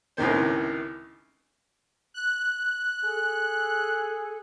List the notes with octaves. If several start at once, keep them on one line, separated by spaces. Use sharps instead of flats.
C#2 A2 C3 D#3 C5
F#6
G#4 A4